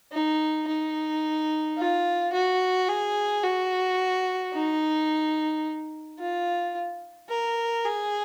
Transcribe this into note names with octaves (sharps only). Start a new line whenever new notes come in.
D#4
D#4
F4
F#4
G#4
F#4
D#4
F4
A#4
G#4